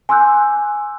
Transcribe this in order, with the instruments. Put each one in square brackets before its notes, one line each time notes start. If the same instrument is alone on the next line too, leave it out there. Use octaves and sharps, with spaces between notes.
[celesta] G#5 C6 D6 E6 F#6 G6